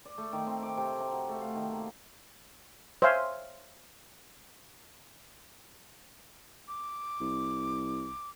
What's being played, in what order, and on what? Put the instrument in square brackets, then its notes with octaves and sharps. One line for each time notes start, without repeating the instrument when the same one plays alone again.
[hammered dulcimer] D5
A3
D#3
C4
D6
C3
A#5
F#4
A3
F5
D#3
A#3
[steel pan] C5 C#5 E5 F5 G#5 C6
[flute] D6
[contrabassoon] C2